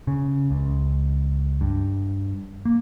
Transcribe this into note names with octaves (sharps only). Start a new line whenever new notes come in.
C#3
C#2
G2
A#3